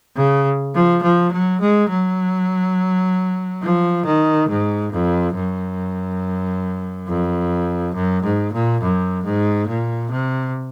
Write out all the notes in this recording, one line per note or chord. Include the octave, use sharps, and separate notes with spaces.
C#3
F3
F3
F#3
G#3
F#3
F3
D#3
G#2
F2
F#2
F2
F#2
G#2
A#2
F#2
G#2
A#2
C3